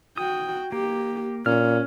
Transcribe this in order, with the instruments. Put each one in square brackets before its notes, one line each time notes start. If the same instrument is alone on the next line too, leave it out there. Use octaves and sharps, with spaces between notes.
[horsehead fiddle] F#4 G5 [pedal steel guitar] D#6
[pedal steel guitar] A#3 [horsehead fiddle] G4
[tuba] A#2 [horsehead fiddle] C#4 [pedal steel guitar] F6